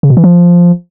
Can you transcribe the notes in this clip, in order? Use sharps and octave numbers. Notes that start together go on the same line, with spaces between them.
C#3
B2
E3
F3